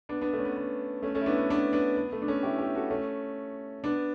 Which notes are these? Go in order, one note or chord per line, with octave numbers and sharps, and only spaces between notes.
B3 D4
B3 D4
A3
C#4
B3
B3
A3 C#4
A3 C#4
E4
B3 D4
B3
B3 D4
B3 D4
B3
A3
D4
A3 C#4
E4 G4
E4 G4
F#4 A4
A3 C#4
B3 D4